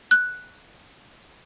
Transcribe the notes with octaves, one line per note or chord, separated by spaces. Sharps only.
F#6